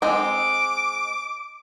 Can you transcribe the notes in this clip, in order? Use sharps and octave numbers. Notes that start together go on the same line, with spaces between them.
G#3 C4 D6